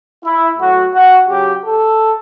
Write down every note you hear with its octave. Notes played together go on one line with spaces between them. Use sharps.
E4
A2 F#3 F#4
F#4
C#3 F#3 G4
A4